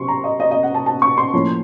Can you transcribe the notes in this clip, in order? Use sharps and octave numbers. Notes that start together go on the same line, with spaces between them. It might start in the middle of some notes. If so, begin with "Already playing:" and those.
Already playing: C3 F#3 C6 C#6
A#5
D#5
D#5
D#5
F#5
A5
A5
C#6
C6
A2 F3 A#3 C#4